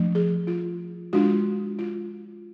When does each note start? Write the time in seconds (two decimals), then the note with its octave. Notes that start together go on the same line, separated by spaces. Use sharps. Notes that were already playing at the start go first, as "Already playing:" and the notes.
Already playing: F3 A3 D4
0.15 G#4
0.47 F4
1.13 G#3 D4 F4 F#4
1.79 F4